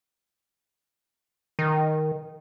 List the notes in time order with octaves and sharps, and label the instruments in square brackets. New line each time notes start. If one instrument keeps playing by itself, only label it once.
[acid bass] D#3